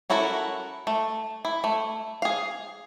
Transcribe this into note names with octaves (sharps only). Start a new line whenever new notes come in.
C#4 E4 F#4 A4 A#4
A3
E4
A3
G#4 F5